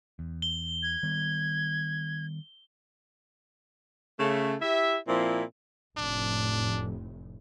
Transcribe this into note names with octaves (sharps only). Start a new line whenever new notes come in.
E2
G7
G#6
D#3 G3 B3
C#3 A3
E4 G4 E5
A#2 F3 C4 E4
F1 A2 D4